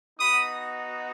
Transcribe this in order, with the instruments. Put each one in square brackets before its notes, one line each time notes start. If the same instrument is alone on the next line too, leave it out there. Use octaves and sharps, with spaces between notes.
[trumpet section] B3 D#4 F#4 B5 D#6